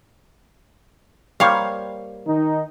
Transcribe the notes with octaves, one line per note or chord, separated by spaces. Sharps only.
G3 A#3 C5 C#5 F5
D#3 D#4